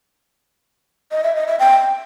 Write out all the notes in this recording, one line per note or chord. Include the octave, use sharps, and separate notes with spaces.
D#5
E5
D#5
E5
G5